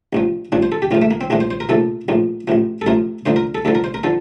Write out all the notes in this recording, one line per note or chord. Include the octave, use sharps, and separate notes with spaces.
A1 G2 F3
A1 G2 F3 D4
C5
A4
G4
A#1 A2 F3 F4
A3
A#3
C4
A#1 A2 F3 D4
C5
C5
A#4
A#1 A2 F3 A4
A#1 A2 F3
A1 A2 F3
A4
A1 A2 F3 A#4
D2 D3 F3 C5
A#4
A4
D2 D3 F3 A4
A#4
C5
A#4
D3 F3 A4